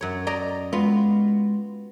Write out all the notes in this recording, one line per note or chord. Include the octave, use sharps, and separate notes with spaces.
F#2 C#5
D5 D#5 A#5
G#3 B3 F4 F#4